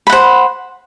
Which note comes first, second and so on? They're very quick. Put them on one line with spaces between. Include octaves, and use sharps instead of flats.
B5 F#5 C5